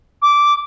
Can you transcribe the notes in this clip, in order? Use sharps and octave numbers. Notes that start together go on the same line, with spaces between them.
D6